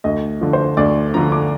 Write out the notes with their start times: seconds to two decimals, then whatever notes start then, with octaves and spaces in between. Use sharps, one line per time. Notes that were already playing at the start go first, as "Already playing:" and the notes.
0.04 D2 D#5
0.41 D3 F3
0.53 C5
0.77 D2 D5
1.14 D3 F3 A#5
1.32 D6